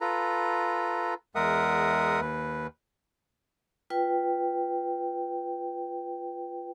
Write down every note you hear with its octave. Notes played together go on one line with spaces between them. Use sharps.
F4 A4 B4 A#5
E2 G#3 A#4 E5 F#5 D#6
D#2 B4
F4 B4 G5